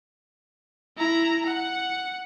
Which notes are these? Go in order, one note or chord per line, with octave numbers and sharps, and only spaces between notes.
E4 A#5
F#5